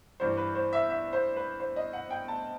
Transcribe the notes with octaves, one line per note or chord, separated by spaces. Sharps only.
G2 E3 G3 C5
B4
C5
E5
E5
C5
B4
C5
D#5
F#5
G5
A5